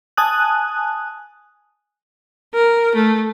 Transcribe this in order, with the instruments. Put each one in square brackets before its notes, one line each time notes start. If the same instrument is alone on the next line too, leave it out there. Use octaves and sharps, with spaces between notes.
[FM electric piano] G#5 A5 D#6 F#6
[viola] A#4
A3